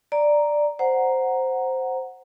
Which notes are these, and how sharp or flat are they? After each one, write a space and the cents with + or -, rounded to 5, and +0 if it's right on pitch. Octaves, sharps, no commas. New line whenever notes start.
D5 +5 A#5 +0
C5 +0 F#5 +0 A#5 +0